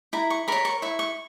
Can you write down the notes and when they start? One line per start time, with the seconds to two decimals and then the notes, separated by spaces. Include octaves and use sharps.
0.13 E4 A#5
0.30 C#6
0.48 A#4 C#5 B5
0.65 C#6
0.82 E4 C#6
0.99 C#6